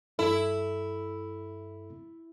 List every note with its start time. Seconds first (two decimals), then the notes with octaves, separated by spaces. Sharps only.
0.19 G2 E4 A4